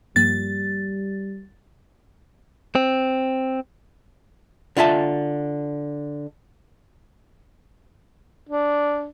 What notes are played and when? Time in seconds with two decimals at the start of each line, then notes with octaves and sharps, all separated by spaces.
0.16 G2 F3 G3 A#3 A6
2.75 C4
4.77 D3 F4 E5 A5
8.49 D4